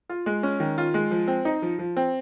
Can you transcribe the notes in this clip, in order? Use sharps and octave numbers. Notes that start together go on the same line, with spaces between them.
F4
G#3
C#4
D#3
F4
G#3
F3
C4
D#4
F3
F3
C4